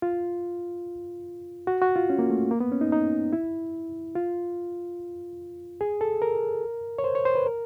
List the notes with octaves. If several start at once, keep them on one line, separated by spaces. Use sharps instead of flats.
F4
F#4
F#4
F4
C#4
A#3
A3
A#3
B3
C#4
D#4
D#4
E4
F4
G#4
A4
A#4
C#5
C5
C#5
C5
B4
A#4